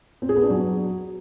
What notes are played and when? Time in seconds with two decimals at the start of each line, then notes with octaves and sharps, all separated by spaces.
0.22 C4
0.29 G#4
0.36 B3
0.43 D4
0.50 F#3